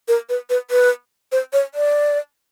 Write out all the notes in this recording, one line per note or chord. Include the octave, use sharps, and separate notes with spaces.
A#4
B4
B4
B4
C5
C#5
D5